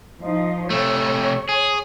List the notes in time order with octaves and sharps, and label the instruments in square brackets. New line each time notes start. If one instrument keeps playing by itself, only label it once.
[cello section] F3 D#4
[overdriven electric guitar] C3 A3 [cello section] C#5
[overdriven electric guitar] G#4